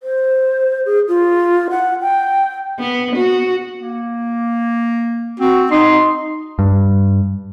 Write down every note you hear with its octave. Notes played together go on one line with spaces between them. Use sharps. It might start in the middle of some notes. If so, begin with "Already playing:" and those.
C5
G#4
F4
F#5
G5
B3
F#4
A#3
C4 F#4
D#4 C6
G2